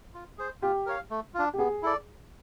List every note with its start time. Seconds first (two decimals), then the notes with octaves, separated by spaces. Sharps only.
0.14 F4
0.38 G#4 C5
0.62 F4 G4
0.86 A#4 C#5 F5
1.10 A3
1.34 D4 F4
1.54 G4
1.58 B3 G#4
1.83 E4 A4 D5